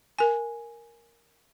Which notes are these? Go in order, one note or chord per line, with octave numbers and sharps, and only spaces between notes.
A#4 G#5